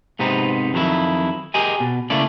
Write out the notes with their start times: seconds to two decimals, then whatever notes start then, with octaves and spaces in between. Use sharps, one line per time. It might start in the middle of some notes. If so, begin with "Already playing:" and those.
0.19 G#2 C3 B3 C4 D#4
0.74 F2 D#3 F#3 E4
1.54 G4 G#4 A#4 D#5 G#5
1.80 B2
2.10 C#3 A3 A#3 E4 A4 D5